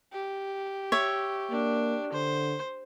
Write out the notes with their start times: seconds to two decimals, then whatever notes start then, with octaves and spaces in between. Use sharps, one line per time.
0.13 G4
0.92 C#5 E5
1.50 A#3 D4
2.12 D3 C5